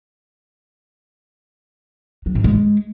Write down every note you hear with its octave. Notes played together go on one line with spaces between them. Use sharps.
F#3
G#2
G#3